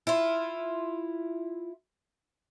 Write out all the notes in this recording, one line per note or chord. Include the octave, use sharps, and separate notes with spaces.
E4 F4